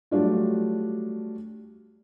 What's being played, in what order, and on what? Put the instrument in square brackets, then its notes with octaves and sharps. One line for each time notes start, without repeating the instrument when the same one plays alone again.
[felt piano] F#3 G3 A3 D4 F4